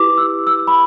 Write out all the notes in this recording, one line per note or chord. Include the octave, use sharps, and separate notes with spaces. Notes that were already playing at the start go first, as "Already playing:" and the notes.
Already playing: E4 G4 B4 D6
E6
E6
B5